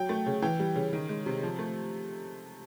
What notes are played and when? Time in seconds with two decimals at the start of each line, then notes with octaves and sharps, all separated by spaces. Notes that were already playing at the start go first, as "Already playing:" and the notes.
Already playing: F#3 G5
0.09 A3
0.26 C#3
0.42 E3 G5
0.60 G3
0.76 C#3
0.93 D#3
1.09 G#3
1.26 C3
1.43 F3
1.59 A3